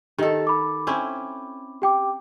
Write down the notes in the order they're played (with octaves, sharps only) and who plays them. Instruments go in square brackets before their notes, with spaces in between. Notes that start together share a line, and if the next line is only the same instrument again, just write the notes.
[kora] D#3 A4 [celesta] G4 D#5
[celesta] B5 D6
[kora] C4 C#4 E4
[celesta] G4 G5 D6